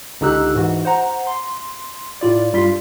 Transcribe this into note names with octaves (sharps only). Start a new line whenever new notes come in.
C#2 D3 D#4 G4 E6 F#6
G#2 E3 F#4
C5 F#5 A#5
C6
A2 F4 D5
G2 G3 F4 C6 B6